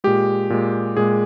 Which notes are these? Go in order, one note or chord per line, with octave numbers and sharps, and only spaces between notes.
A#2 G#3 G4
A#2 G#3
A#2 G#3 G#4